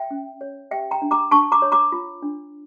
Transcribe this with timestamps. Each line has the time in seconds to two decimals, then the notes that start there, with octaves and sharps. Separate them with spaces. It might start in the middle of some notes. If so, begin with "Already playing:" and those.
Already playing: E5 G5
0.11 C#4
0.41 C#5
0.71 G4 E5 G5
0.91 G5 A#5
1.02 D4
1.11 A#5 D6
1.31 D4 A5 C#6
1.52 A#5 D6
1.62 C#5
1.72 A#5 D6
1.92 F4
2.22 D4